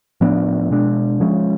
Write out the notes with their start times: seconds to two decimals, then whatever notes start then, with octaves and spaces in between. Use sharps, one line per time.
0.21 A2 F3 B3 D4
0.71 B2 G#3 D4
1.20 F3 G#3 C#4